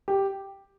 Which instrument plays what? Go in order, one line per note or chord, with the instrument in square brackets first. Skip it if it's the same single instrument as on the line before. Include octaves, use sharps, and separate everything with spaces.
[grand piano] G4